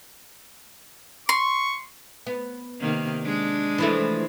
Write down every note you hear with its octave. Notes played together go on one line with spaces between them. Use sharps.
C6 C#6
B3
C3 D#3 A#3
G#3 D4
E3 F3 A3